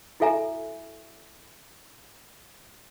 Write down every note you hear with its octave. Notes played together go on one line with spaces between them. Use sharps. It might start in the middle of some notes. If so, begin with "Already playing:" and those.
E4 F#4 A4 E5 G#5 A#5